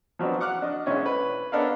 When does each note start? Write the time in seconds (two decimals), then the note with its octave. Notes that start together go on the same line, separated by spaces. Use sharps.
0.19 F3 F#3 B3 C4 D4
0.41 F#5 D6 F6 F#6
0.62 D4 D#5
0.86 B1 G#3 C#4 D4 E4 C#5
1.06 B4
1.52 B3 D4 A4 A#4 C#5 F5